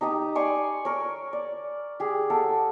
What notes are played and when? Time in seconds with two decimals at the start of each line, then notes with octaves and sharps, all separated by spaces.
0.01 D#4 G4 D#5 A#5
0.35 D5 G#5 C6 C#6
0.85 A#4 C#5
1.33 D5
2.00 G4 G#4
2.30 A4 A#4 F#5